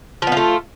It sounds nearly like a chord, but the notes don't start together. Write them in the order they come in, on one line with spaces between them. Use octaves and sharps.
F3 B3 F4 A3